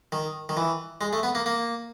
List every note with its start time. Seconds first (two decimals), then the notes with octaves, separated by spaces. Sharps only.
0.12 D#3
0.49 D#3
0.57 E3
1.01 G#3
1.13 A3
1.23 B3
1.35 A#3
1.46 A#3